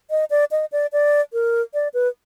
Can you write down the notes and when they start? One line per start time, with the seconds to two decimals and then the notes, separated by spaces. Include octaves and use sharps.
0.10 D#5
0.30 D5
0.51 D#5
0.72 D5
0.92 D5
1.33 A#4
1.74 D5
1.94 B4